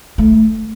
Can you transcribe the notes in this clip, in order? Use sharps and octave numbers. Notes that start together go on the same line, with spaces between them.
A3